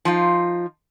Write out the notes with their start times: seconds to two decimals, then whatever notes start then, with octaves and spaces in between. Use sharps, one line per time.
0.05 F3 D#4 F4